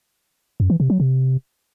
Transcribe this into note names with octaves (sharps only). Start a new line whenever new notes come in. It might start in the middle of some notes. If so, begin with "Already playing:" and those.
F#2
E3
C3
F#3
C3